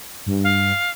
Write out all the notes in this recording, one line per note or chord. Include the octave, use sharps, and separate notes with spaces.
G2
F5